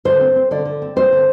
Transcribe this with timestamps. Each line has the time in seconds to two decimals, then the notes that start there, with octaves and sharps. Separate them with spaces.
0.05 D3 C5
0.21 C4
0.36 C4
0.51 D3 D5
0.65 D3
0.82 C4
0.96 C4 C5
1.12 D3